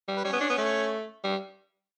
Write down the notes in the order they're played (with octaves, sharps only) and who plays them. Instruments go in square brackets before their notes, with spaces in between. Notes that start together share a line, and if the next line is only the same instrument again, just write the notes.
[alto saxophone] G3
[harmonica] B4
[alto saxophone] G3 [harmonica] C#4 C#5
[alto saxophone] B3
D4
B3
A3
G3